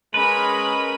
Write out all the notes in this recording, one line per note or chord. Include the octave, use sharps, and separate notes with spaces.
G#3 C#4 A#4 B4 B5